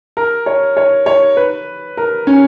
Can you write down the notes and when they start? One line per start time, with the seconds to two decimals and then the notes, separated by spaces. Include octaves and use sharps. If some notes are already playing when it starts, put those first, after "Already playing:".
0.17 A#4
0.46 C#5
0.77 C#5
1.06 C#5
1.37 B4
1.97 A#4
2.27 C#4